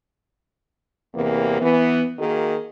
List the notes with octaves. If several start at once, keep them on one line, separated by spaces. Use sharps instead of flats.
E2 C3 E3 A#3
E3 B3
D#3 A#3 F#4 G#4